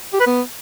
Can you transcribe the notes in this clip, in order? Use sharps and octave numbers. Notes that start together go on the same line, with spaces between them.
G4
B4
B3